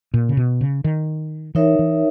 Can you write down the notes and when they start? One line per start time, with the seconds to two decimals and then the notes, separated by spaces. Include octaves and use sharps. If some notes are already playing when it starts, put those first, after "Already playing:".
0.14 A#2
0.29 C#3
0.37 B2
0.61 C#3
0.84 D#3
1.55 E3 D#4 A#4 C#5 E5
1.79 E3